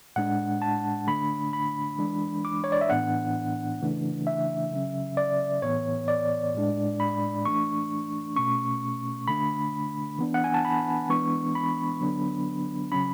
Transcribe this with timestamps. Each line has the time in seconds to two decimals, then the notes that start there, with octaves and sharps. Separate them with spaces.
0.16 A2 G#3 D4 F#5
0.62 A5
1.07 D3 A3 D4 B5
1.53 B5
1.99 E3 G#3 D4
2.45 D6
2.64 C#5
2.72 D5
2.81 E5
2.89 A2 E3 B3 D4 F#5
3.81 C#3 E3 A3 D4
4.27 E5
4.72 C#3 F#3 C#4
5.17 D5
5.62 A2 E3 B3 C#5
6.08 D5
6.55 A2 G#3 D4
7.00 B5
7.45 E3 A3 D4 C#6
8.36 B2 A3 C#4 C#6
9.28 D3 A3 D4 B5
10.19 E3 B3 D4
10.34 F#5
10.44 G#5
10.54 A5
10.65 B5
11.09 E3 G#3 B3 D4 C#6
11.55 B5
12.01 D3 F#3 B3 D4
12.92 C#3 F#3 C#4 B5